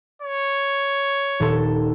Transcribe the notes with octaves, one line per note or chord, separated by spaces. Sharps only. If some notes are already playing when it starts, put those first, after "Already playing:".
C#5
D#1 A4 C6